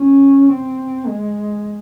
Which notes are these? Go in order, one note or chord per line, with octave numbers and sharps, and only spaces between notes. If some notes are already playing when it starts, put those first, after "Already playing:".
Already playing: C#4
C4
G#3